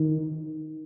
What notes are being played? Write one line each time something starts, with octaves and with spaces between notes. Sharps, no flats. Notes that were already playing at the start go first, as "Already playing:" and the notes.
Already playing: D#3